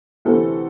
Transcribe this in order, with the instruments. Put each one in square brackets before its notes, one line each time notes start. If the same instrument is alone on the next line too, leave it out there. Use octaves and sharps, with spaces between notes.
[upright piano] D2 C3 E3 A3 C4 A4